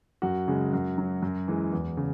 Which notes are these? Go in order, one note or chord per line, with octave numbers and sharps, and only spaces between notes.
F#2 F#4
C#3 G#3
F#2
F#3
F#2
E3 G#3
E2
C#3